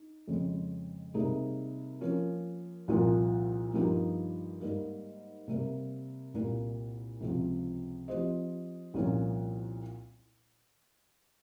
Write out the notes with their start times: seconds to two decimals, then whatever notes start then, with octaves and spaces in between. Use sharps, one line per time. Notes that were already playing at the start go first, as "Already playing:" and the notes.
Already playing: D#4
0.27 F2 C#3 G#3
1.14 C3 G3 A#3 D#4 G#4
2.01 F3 A#3 C#4
2.88 C2 A#2 F3 A#3 F4
3.74 G2 F3 A#3 D#4 G4
4.61 G#2 G3 A#3
5.48 C3 G3 A#3
6.34 C2 A#2 G3 A#3
7.21 C#2 C3 F3 C4
8.08 F3 C4 G4 C5 D#5
8.94 C2 A#2 F3 A#3 C#4